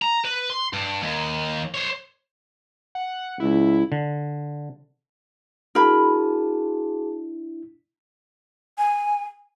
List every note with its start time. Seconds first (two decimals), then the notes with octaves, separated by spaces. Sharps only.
0.02 A#5
0.25 B4
0.50 C6
0.73 G2
1.03 D#2
1.74 C5 C#5
2.95 F#5
3.40 C#2 E4
3.92 D3
5.75 D4 E4 F#4 G#4 A#4 A5 B5
8.78 G#5